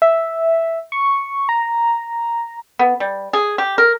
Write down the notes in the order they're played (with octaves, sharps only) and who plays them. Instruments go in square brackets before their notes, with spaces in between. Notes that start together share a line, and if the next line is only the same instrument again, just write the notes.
[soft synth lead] E5
C#6
A#5
[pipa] B3
G3
G#4
G4
A#4